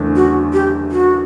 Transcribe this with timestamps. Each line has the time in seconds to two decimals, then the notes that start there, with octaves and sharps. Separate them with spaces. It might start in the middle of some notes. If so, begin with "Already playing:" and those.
Already playing: F#1 E2 D3 A3
0.16 F#4
0.53 G4
0.92 F#4